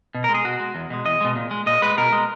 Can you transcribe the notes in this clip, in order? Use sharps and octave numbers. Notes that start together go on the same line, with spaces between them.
B2
A#4
G#3
G#4
B2 F#4
G#3
E2
B2 G#3
E2 D#5
B2 G#3
A#2
G#3
A#2 D#5
G#3 B4
B2 A#4
G#3